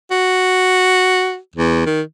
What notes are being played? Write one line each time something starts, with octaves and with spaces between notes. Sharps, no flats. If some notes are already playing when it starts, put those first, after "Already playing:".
F#4
E2
D#3